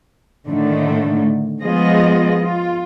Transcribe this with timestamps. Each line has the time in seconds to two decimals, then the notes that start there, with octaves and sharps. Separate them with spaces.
0.47 A2 D3 D#3 A3
1.61 F3 G#3 B3 F4 G#4 D#5
2.40 F4